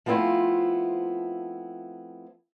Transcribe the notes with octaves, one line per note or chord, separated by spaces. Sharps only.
F3 A3 B3 C4 E4 F4